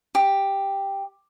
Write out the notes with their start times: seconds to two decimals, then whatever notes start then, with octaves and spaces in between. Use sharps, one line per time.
0.15 G4